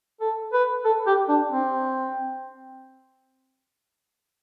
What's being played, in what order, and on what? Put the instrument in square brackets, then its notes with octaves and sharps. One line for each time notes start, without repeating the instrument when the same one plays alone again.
[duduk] A4
B4
A4
G4
D4
C4